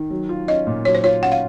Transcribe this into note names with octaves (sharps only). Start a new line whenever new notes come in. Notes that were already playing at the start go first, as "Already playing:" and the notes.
Already playing: D#3
F#3
F4
C#4 D#5
A#2
F#3 C#5
C5
F4 C#5
C#4 F#5
F5